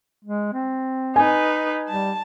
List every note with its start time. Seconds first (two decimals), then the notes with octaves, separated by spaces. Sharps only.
0.25 G#3
0.53 C4
1.16 D#4 B4 G#5
1.89 G3 A5